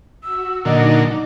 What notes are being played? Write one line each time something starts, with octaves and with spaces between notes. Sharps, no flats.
F#4 E6
A#2 D3 F#3 D#4 D#5 D6